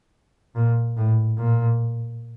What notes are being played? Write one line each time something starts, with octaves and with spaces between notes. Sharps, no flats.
A#2
A2
A#2